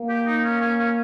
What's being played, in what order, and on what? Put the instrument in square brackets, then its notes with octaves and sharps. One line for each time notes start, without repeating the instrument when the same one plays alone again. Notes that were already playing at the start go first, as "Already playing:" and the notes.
Already playing: [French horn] A#3
[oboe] G4
D#4
C#4
C#4
C#4